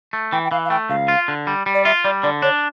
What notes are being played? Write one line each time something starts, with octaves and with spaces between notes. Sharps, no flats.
A3
E3 G5
G5
E3 F5
F5
A3 G5
C#2 F5
F4
D3
G3
G3
D5
F4 E5
G3 D5
D3 D5
D4 C#5